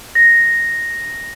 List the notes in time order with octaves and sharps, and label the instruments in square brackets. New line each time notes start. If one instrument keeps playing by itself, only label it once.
[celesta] A#6